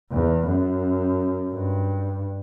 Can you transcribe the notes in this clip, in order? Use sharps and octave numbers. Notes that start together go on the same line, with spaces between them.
E2
F#2
G2